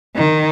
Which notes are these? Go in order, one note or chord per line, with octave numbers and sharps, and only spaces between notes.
D#3